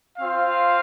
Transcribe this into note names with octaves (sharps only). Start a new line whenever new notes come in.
C4 F4 C5 F5